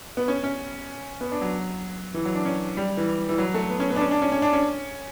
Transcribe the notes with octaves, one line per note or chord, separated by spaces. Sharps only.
B3
C#4
C#4
B3
D4
F#3
E3
F#3
D4
C#4
G3
E3
E3
F#3
A3
B3
C#4
B3
D4
C#4
D4
C#4
C#4
D4
C#4